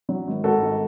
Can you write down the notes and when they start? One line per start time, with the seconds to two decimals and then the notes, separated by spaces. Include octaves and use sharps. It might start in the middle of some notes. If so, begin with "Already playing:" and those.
0.09 F#3
0.27 G#1
0.44 G#2 F#4 A4
0.62 G#1